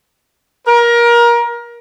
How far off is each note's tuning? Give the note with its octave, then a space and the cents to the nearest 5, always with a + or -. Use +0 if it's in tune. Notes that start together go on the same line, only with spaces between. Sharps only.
A#4 +25